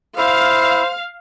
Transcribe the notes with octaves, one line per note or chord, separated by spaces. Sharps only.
E4 C5 F5